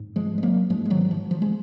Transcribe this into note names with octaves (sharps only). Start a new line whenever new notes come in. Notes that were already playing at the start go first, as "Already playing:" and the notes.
Already playing: G#2
F3 G#3
G#3
F#3 A#3
G#2 F3 G#3
G#3
D#3 F#3
F3
F3
G#3